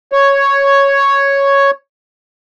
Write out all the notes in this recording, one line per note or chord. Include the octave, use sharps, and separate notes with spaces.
C#5